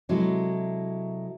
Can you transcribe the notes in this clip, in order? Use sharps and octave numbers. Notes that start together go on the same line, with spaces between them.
C3 F#3 G#3 E4 A4